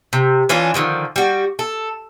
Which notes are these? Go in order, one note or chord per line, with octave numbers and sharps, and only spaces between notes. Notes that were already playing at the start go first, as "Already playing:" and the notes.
C3
E3 C#4 D4 F4
D3 D#3 F3 G#3
G3 F#4
A4